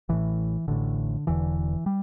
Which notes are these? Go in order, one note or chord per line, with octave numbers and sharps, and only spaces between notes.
A1 A2 E3
A1 A2 D3
E1 E2 D3 E3
G3